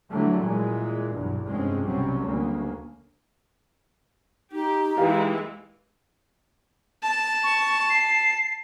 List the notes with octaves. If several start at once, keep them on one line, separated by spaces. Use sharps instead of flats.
D3 E3 F#3 G3 A3
A#2 E3 G#3
B1 E2 G2
F1 G2 G#3 C4 C#4
B1 C3 F#3 G3 C4 C#4
D2 C#3 A#3
D#4 G4
E3 G#3 G4 F5
A5
C#6
C7